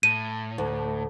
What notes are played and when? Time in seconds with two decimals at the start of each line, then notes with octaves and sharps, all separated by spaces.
0.03 A2 D#7
0.58 D2